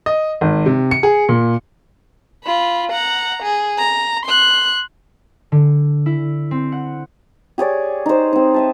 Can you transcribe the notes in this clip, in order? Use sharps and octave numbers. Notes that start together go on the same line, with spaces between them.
D#5
G#1
C3
C#7
G#4
A#2
F4 B5
F#5 A#5
G#4
A#5
C6 F#6
D3
E4
C4
F#5
G4 G#4 C#5 D5
D#4 C5
C4 D#4
D#5 E5 A5